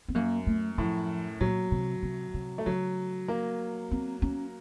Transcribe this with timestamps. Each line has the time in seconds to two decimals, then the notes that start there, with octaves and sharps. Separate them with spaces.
0.08 C4
0.15 F#2 A#3
0.47 A3
0.78 A2 F3
1.41 A#2 F#3
1.72 C3
2.03 C3
2.34 C3
2.58 A3
2.66 C#3 F#3
3.28 A#3
3.91 C4
4.22 C#4